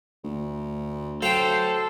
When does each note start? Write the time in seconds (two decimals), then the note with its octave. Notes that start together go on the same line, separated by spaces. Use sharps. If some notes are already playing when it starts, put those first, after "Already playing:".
0.24 D2
1.22 F#3 A4 C5 F5 G5